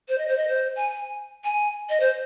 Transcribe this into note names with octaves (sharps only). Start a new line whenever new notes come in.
C5
D#5
C5
D#5
C5
G#5
G#5
D#5
C5